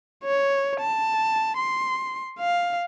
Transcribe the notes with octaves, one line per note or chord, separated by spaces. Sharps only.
C#5
A5
C6
F5